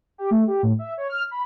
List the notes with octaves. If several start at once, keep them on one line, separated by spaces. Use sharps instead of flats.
G4
A3
G4
A2
E5
C#5
F6
B5